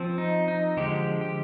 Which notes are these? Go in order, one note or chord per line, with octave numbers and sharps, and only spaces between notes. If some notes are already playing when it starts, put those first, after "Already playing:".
Already playing: F3 C4
D#4
D#4
D3 F3 G#3 G4
G4